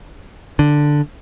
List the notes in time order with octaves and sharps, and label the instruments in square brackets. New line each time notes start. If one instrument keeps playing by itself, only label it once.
[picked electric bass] D3